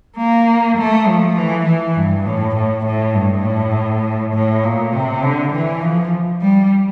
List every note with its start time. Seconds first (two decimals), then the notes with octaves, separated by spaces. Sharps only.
0.17 A#3
0.77 A3
1.07 F3
1.37 E3
1.66 E3
1.96 G2
2.26 A2
2.55 A2
2.85 A2
3.14 G2
3.44 A2
4.33 A2
4.63 A#2
4.92 C3
5.22 D3
5.53 E3
5.81 F3
6.41 G3